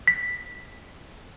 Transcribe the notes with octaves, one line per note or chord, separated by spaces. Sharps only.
B6